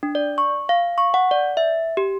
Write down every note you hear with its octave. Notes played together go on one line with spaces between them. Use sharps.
D4
D5
C#6
F5
C#6
F#5
D5
E5
G4